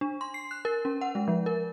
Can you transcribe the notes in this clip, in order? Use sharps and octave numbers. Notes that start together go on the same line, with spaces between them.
D4
C6
C7
F#6
A#4
C#4
F#5
G#3
F3
A#4